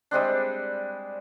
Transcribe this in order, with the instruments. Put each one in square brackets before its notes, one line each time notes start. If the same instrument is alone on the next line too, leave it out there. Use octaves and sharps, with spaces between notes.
[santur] G3 G#3 C4 D4